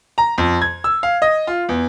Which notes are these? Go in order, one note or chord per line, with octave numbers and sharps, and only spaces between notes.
A#5
F2
G#6
E6
F5
D#5
F4
E2